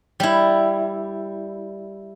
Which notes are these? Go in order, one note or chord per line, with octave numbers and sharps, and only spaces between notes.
G3 E4